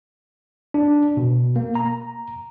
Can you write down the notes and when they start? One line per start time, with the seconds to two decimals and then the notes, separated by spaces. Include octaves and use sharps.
0.74 D4
1.17 B2
1.56 A#3
1.75 A#5